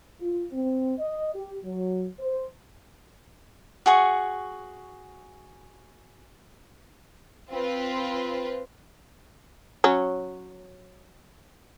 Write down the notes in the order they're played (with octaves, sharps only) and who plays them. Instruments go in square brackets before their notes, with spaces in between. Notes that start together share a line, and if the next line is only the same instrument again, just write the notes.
[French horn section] F4
C4
D#5
G4
F#3
C5
[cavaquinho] F#4 G#4 C#6
[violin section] C4 F4 B4
[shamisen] F#3 C#4